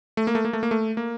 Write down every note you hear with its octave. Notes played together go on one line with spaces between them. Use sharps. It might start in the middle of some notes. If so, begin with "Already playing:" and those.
A3
A#3
A3
A#3
A3
A#3
A3
A#3